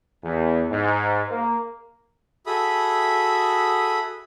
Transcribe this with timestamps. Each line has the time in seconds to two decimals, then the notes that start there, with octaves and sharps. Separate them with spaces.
0.23 E2
0.70 G#2
1.29 A#3
2.46 F#4 G#4 A4 E5 B5 D#6